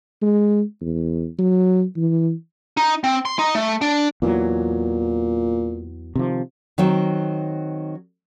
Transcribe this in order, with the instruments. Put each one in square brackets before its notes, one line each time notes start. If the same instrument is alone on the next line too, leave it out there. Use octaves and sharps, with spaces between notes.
[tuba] G#3
E2
F#3
E3
[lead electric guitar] D#4
C4
C6
D#4
A3
D4
[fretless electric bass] E2 E3 F#3 [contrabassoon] A#2
[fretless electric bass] C3 D#3 F3
[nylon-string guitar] D#3 F#3 C4